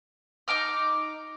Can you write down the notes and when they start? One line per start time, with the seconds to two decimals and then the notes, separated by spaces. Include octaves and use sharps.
0.48 D#4 A#5 D6 F6